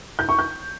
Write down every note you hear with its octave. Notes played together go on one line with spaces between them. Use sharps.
G6
C#6
G6